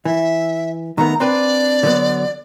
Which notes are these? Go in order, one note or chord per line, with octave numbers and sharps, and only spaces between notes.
E3 E5
D#3 A3 B3 A#5
C4 D4 B4 D5
D3 F#3 B3